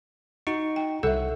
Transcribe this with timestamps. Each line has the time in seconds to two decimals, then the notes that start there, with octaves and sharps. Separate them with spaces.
0.47 D#4 F#4 C#6
0.76 G5
1.03 C2 A4 E5 F#5 E6